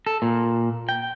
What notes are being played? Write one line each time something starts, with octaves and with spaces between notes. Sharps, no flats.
A4
A#2
G5